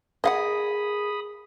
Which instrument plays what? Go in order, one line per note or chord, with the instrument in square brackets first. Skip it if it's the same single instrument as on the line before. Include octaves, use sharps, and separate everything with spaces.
[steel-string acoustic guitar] G#4 A#4 [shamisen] D#5 F5 F#5 [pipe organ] B5 D#6